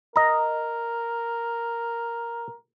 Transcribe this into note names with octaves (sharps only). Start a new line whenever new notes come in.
A#4 D#5 A#5